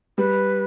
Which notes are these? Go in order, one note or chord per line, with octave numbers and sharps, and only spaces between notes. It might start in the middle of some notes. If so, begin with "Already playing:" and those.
G3 B4